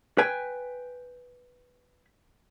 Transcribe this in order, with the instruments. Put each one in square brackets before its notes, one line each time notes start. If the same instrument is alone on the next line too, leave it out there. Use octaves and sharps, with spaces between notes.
[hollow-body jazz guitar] B4 G5 G#5